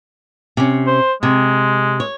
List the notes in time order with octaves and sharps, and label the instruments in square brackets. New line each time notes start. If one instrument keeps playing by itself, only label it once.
[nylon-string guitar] C3 C#4
[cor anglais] C5
[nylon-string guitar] C3 [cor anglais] G#3
[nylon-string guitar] C#5